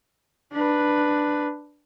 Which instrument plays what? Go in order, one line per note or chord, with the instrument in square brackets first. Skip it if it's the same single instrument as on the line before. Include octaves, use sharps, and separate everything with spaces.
[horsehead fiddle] D4 B4